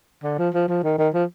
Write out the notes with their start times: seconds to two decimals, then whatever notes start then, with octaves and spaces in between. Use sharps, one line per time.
0.23 D3
0.39 F3
0.54 F3
0.69 F3
0.84 D#3
0.98 D#3
1.14 F3